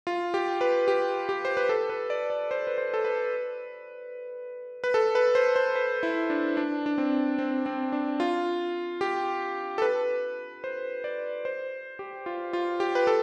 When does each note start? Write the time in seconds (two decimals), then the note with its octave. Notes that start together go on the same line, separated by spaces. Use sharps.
0.07 F4
0.34 G4
0.61 B4
0.88 G4
1.29 G4
1.45 C5
1.57 B4
1.69 A4
1.90 B4
2.10 D5
2.30 D5
2.51 C5
2.67 B4
2.78 C5
2.94 A4
3.05 B4
4.84 B4
4.94 A4
5.15 B4
5.35 C5
5.56 C5
5.76 B4
6.03 E4
6.30 D4
6.57 D4
6.86 D4
6.98 C4
7.39 C4
7.66 C4
7.92 D4
8.20 F4
9.01 G4
9.78 A4
9.82 B4
10.64 C5
11.04 D5
11.45 C5
11.99 G4
12.26 F4
12.53 F4
12.80 G4
12.95 B4
13.07 A4